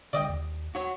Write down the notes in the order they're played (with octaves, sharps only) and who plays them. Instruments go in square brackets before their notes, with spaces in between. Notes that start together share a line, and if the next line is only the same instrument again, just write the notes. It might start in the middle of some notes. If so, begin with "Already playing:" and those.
[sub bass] D3 [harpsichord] D5 D#5 G5
[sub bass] D#2
[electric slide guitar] F#4 C#5